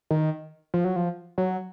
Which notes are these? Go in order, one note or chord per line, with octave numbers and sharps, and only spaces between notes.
D#3
F3
F#3
F3
F#3